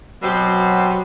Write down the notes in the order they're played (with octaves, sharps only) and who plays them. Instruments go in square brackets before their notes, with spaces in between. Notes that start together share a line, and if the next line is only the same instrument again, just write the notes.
[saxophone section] B2 C4 G4 [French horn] F#3